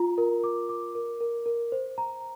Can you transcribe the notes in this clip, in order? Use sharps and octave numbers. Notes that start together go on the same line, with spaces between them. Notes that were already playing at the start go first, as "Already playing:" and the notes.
Already playing: F4 A#5
A#4
D6
D6
A#4
A#4
A#4
C5
A#5